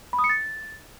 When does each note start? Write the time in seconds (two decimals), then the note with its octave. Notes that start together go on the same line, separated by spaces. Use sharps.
0.13 B5
0.19 D#6
0.24 C#7
0.29 A6